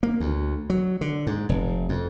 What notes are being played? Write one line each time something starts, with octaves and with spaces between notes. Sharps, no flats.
A#3
D2
F#3
D3
G#2
F1
F2